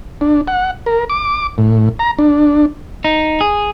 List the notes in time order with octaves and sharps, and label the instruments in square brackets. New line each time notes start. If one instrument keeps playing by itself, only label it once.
[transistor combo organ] D4
F#5
A#4
D6
A2
A#5
D4
[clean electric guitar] D#4
G#4